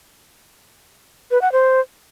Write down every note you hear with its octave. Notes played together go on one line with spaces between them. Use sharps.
B4
F#5
C5